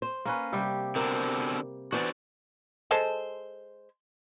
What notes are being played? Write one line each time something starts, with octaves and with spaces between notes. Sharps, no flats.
C5
A#3 C#4 B4
C3 G3 G4
B2 D3 C4 A#4
E3 B3 D4 F#4 C5 D5
G#3 A4 C5 C6